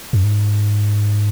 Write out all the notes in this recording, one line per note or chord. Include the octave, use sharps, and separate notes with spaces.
F#2
G#2